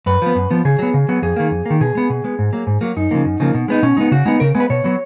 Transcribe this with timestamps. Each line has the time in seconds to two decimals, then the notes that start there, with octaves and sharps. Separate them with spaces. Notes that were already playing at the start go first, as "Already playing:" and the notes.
0.06 F#2 B4
0.22 F3 B3
0.35 F#2
0.51 F3 B3
0.65 C#3 G#4
0.79 F#3 B3
0.94 C#3
1.09 F#3 B3
1.22 F2 G#4
1.36 D#3 A#3
1.51 F2
1.66 D#3 A#3
1.80 B2 G#4
1.95 G#3 B3
2.10 B2
2.24 G#3 B3
2.39 G#2
2.53 F#3 A#3
2.67 G#2
2.81 F#3 A#3
2.96 F#2 D#4
3.11 C#3 F3 A#3
3.25 F#2
3.40 C#3 F3 A#3
3.54 B2
3.68 G#3 B3 D#4
3.82 B2 C#4
3.97 G#3 B3 D#4
4.11 C#3 F#4
4.25 G#3 B3 D#4
4.40 C#3 A#4
4.55 G#3 B3
4.60 B4
4.70 B2 C#5
4.84 F#3 B3